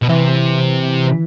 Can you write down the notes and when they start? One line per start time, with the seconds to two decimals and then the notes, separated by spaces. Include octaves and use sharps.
0.02 B2
0.09 C3 E3